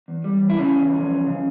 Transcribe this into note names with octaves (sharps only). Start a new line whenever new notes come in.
E2
G3
E2
E4
C#3 C#4
E2
F3
E2
C#3